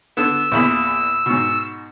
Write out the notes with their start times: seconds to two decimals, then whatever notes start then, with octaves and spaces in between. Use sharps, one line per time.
0.17 D3 B3 E6
0.52 A#1 E2 B5
1.26 G#2 B2